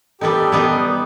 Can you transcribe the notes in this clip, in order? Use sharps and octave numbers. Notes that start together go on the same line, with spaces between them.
G3 B3 D#4 G4 A4
G3 B3 D#4